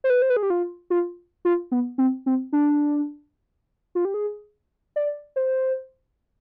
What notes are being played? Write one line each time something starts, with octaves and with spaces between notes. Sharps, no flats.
C5
B4
C5
B4
G#4
G4
F4
F4
F4
B3
C4
C4
D4
F4
G4
G#4
D5
C5